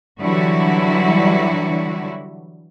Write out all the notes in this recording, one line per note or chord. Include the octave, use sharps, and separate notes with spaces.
D3 E3 F#3 G3 E4 F#4